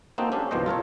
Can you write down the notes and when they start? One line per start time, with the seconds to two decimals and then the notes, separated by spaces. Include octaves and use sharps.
0.18 A#3 C4 D#4 F#4 A4 C5
0.32 C#4 D4 G4 A4 F5
0.51 G1 C2 B2 F3 C5 D#5
0.66 F4 A4 A#4 C#5